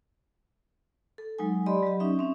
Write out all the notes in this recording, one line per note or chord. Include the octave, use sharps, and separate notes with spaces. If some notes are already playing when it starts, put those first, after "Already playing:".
A4
F#3 G#3 D#4 G#5
G4 D5 D#5 B5 C6
F#3 G4
C#4 D#4 E5
C4 C#4